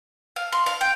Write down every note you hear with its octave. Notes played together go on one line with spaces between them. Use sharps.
F5
C6
F5
G5